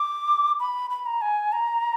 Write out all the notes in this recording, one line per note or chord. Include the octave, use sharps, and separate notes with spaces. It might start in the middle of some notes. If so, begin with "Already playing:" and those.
Already playing: D6
B5
B5
A#5
G#5
A#5